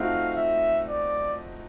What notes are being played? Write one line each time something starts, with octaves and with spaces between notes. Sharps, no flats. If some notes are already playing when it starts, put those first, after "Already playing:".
Already playing: F3 A3 C4 D#4 F#4 F5
E5
D5